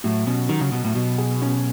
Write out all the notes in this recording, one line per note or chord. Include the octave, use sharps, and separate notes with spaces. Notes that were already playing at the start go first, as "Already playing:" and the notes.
A2 F#3
B2 C#4
D#3 F#3
C#3
B2 F#3
A2
B2 F#3
G#4
C#4